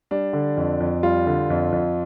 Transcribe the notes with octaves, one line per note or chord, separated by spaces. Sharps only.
G3 D4
D3
F2
F2
G3 F4
D3
F2
F2